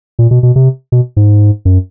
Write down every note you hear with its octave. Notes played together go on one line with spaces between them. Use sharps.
A#2
B2
B2
C3
B2
G#2
F#2